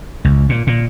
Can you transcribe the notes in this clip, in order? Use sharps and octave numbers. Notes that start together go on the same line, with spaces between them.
C#2
A#2
A#2